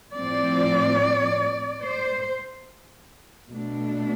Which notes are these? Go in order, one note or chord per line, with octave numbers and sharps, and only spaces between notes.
A2 F3 C4 D5
C5
B2 A3 D4